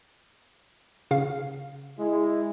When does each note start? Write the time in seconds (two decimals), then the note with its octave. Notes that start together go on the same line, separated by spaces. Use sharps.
1.11 C#3 F5
1.99 G#3 E4